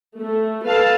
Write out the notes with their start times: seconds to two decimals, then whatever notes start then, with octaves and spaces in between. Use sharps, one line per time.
0.18 A3
0.65 A4 B4 F5 A5